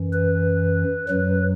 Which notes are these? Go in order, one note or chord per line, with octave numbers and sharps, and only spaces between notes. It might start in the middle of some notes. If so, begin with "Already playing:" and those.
Already playing: F#2 E3
B4
F#2 F#3 B4